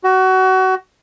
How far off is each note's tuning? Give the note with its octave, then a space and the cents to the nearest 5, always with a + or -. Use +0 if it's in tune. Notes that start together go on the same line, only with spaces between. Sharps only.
F#4 +25